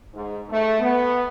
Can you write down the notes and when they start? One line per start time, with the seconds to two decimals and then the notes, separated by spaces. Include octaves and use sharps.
0.14 G#2
0.50 A3
0.79 B3